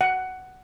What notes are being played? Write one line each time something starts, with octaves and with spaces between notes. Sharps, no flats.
F#5